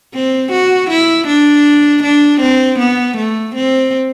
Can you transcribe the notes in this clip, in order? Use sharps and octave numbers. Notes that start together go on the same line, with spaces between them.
C4
F#4
E4
D4
D4
C4
B3
A3
C4